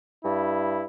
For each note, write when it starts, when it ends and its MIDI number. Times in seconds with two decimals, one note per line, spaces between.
0.25 0.86 43
0.25 0.86 64